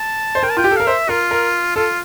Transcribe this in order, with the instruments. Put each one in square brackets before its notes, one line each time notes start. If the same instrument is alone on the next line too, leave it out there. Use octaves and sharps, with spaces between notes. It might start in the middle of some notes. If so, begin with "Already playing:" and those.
Already playing: [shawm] A5
[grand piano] C5
[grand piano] A#4 [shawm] G5
[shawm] A5
[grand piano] F4 [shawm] G5
[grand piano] G4
A4
[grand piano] A#4 [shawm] F5
[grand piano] C5 [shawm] E5
[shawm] F4 [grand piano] A#4
[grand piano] A#4
[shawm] F4 [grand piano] A4